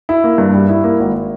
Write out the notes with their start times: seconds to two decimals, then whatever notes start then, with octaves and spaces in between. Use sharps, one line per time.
0.09 E4
0.24 A#3
0.38 G2
0.54 G3
0.69 E4
0.84 A#3
0.99 G#1